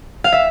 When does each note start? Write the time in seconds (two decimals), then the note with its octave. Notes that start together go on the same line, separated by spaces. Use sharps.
0.24 F5
0.32 E5